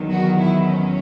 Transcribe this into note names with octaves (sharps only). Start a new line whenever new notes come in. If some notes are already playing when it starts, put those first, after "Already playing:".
Already playing: E2 D#3 F#3
F#4
E4
C#4